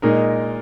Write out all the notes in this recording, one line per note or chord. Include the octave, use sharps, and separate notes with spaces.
A#2 G#3 D#4 A#4